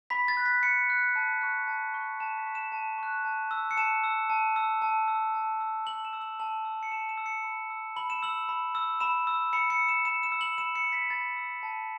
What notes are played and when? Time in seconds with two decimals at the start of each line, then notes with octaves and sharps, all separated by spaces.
0.10 B5 B6
0.28 A6
0.37 F#6
0.46 B6
0.63 B5 C#7
0.90 F#6
1.16 A5
1.41 C#6 F#6
1.68 A5
1.94 C#6 F#6
2.20 A5 E7
2.38 B6
2.46 C#6 F#6
2.55 E7
2.72 A5
2.98 C#6 F#6
3.25 A5
3.51 E6
3.71 C#7
3.77 A5 E7
4.04 E6
4.30 A5
4.56 E6
4.82 A5
5.08 E6
5.34 A5
5.60 E6
5.87 A5 F#7
6.05 E7
6.13 E6
6.22 F#7
6.40 A5 F#7
6.65 E6
6.83 C#7
6.92 A5 E7
7.09 E7
7.18 E6
7.26 C#7
7.44 B5
7.70 E6
7.96 B5 F#7
8.10 E7
8.23 E6 F#7
8.49 B5
8.75 E6
9.00 B5 E7
9.27 E6
9.53 B5 C#7
9.70 C#7
9.79 E6
9.89 E7
10.05 B5 E7
10.23 E7
10.32 E6
10.41 F#7
10.58 B5 E7
10.76 C#7
10.85 E6
10.92 B6
11.10 B5 A6
11.37 E6
11.63 A5